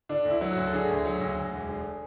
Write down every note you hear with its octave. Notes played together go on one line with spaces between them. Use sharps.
D3 D4
D2
E4
F#3
F#4
D2
A4
D3 G#4
D2
F#3
D2
D2
E1
D3